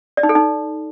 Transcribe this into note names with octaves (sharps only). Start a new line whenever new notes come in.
D5
D#4
A4
D#4